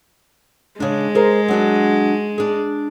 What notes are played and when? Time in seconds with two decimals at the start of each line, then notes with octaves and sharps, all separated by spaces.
0.80 C#3 G#3 D4
1.15 G#4 A#4 C5
1.48 F#3 D4 F#4
2.38 D4 G#4